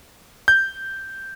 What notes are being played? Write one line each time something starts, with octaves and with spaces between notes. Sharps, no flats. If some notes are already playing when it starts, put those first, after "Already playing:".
G6